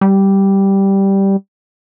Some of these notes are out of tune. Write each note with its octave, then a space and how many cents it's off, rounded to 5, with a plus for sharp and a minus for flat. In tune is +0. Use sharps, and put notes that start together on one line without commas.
G3 -5